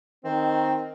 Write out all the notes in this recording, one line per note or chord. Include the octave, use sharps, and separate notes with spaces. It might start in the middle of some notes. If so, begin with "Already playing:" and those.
D#3 C4